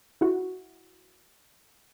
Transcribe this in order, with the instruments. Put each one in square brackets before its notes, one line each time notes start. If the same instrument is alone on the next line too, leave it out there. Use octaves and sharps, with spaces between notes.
[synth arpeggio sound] E4 F#4